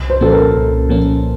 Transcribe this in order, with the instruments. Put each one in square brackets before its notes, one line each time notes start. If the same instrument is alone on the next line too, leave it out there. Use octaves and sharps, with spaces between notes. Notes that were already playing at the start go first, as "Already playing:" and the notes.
Already playing: [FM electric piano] C2
[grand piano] C5
[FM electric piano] A#2 F3 A#3 C#4 [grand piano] A4
[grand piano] A#4
[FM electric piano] C2
A#2 F3 A#3 C#4